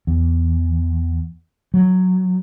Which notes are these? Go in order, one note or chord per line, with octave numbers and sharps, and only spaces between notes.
E2
F#3